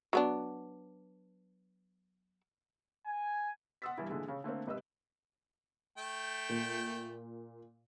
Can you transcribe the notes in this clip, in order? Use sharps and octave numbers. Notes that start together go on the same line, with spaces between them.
F#3 B3 D4
G#5
F#5 C6 D#6 E6 A6 B6
G2 E3 E4
A#2 D3 E3 G#3
C#3
D3 A3 A#3 C4
G#1 C3 B4 D#5 E6
A3 G5
A#2